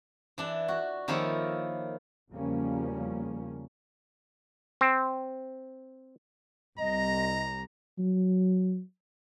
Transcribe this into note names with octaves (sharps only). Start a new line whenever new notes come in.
E3 D4
F#4
D#3 F3 A#3 E4 A4 C#5
E2 C#3 F3 G3 A#3 C#4
C4
C2 D#5 A#5
F#3